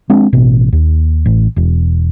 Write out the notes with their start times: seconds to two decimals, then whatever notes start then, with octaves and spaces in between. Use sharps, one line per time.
0.10 G#3 C4 D4
0.33 A1 B2
0.73 D#2
1.26 A1
1.56 E1